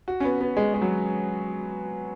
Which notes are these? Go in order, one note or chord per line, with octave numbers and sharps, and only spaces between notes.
F#4
C#4
B3
B3
G#3
G#3
F#3